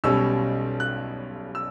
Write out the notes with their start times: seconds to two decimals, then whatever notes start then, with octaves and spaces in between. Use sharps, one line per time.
0.04 B1 B2 G3 C#4 E6
0.80 F#6
1.55 E6